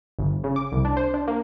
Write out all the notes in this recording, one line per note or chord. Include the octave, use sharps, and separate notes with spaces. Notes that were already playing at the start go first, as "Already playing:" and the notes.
G1
C#3
D6
C2
D4
C5
D4
A#3